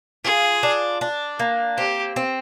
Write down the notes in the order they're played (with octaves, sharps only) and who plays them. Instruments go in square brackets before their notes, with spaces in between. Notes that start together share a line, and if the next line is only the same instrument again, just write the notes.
[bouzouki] F4 [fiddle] G#4
[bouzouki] D4
D4
A#3
[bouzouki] C4 [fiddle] G4
[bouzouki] C4